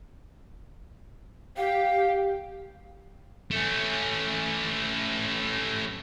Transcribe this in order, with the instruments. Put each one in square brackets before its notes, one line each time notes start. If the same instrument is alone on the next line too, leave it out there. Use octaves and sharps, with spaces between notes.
[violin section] G4 [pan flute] F5
[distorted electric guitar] A3 C#4